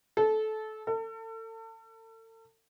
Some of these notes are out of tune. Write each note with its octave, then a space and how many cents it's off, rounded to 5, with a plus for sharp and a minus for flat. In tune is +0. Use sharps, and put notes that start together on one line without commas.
A4 -20
A4 +35